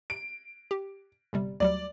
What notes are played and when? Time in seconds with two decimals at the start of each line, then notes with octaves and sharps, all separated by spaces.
0.10 D7
0.71 G4
1.33 G1 C3 G3
1.60 D2 F#3 G3 D5